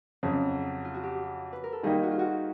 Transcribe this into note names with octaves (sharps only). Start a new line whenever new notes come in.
F2 C#3 F#3 F#4
F4
F#4
G4
B4
A#4
A4
D#3 G3 A#3 D#4 G#4
F#4
F4
F#4